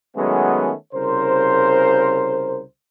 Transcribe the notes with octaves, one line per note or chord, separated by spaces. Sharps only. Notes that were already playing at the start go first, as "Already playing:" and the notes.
D#3 F#3 G#3 A3 B3 C#4
C2 C#3 A#4 C5